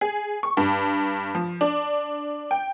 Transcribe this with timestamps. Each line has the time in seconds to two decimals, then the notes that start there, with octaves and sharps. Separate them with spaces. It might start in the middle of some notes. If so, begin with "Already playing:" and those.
0.01 G#4
0.43 C#6
0.57 G2
1.35 F3
1.61 D4
2.51 G5